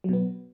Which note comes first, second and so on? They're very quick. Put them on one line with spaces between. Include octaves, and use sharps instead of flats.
F#3 B2 B3